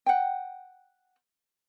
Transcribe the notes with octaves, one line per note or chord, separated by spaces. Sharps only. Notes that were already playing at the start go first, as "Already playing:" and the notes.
F#5 G5